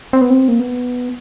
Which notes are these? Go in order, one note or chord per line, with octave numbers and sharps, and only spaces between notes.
C4
B3
C4
A#3
B3